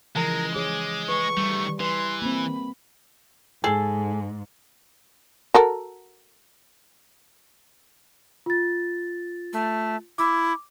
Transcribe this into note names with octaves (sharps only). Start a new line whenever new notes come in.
C#3 E3 F3 G#3 A#4
G#4 C#5 D6
B4 C#6
D#3 G3 A3
E3 B4 C6
A#3 C4 B5
G#2 G#4 A4
F#4 A4 A#4
F4 A6
A3
E4 D6